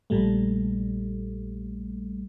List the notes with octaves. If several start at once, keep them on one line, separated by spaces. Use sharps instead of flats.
A#1 A#2 G3 A3